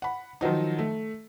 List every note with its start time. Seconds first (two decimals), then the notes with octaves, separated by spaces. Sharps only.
0.02 F#5 B5
0.41 D#3 F3 F#3 D#4
0.79 A3